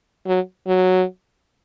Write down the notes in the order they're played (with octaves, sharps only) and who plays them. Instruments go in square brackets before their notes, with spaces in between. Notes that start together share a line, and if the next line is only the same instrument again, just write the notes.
[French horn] F#3
F#3